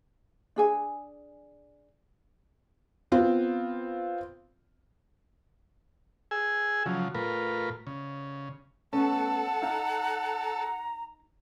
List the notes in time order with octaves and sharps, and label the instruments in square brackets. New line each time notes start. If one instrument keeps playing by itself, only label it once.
[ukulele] D4 G#4 G#5
[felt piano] B3 C4 F4
[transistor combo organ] G#4 G#5 E6
C#3 F3 F#3
A2 F4 A#4 B4
C#3
[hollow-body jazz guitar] A3 B3 C#4 [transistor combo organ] A4 [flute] F#5 [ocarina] A5
[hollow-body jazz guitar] D#4 F5 [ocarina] A#5